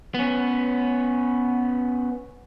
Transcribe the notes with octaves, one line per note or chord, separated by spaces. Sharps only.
B3 C#4